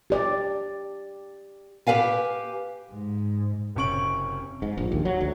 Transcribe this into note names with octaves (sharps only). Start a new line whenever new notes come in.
G4 D5
G4 G#4 B4 F5 G#5
G#2
F#1 C3 C#4 C#6 D7 F#7
G#2
A#1
D#2
F#3
D2